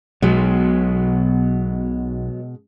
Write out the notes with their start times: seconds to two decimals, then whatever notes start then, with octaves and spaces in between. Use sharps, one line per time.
0.22 B1 B2 F#3 G#3 B3